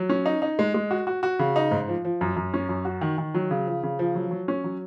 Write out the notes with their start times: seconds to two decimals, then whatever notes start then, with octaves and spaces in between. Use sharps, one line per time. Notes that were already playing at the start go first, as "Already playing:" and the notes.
Already playing: F#3
0.09 C#4
0.26 D#4
0.42 D#4
0.59 G#3
0.74 G#3
0.91 F#4
1.07 F#4
1.23 F#4
1.39 C#3
1.56 D#4
1.71 G#2
1.88 F3
2.05 F3
2.21 F#2
2.36 F#2
2.54 C#4
2.69 F#2
2.85 F#4
3.01 D#3
3.18 D#3
3.34 F#3
3.51 C#3
3.66 F3
3.83 C#3
3.99 F3
4.15 F#3
4.31 F#3
4.48 C#4
4.64 F#3